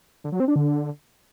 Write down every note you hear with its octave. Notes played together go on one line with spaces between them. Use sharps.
D3
F#3
C4
D4
D3